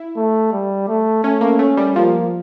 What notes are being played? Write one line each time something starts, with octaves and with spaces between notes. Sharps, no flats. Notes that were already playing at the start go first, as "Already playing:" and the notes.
Already playing: E4
A3
G3
A3
A3 C#4
A#3
A3 C#4
G3
F3 A#3